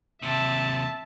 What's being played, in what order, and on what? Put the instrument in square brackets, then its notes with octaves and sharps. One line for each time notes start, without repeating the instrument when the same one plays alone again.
[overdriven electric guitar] D#2 C3 [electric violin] E5 A5